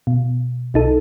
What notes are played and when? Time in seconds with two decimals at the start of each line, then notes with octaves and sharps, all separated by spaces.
0.07 B2
0.74 B1 D#4 A4